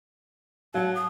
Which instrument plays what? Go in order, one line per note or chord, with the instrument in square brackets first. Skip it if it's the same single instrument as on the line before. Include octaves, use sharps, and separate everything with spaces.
[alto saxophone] F#3 [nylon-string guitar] F5 F#5 [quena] A5
[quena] D#6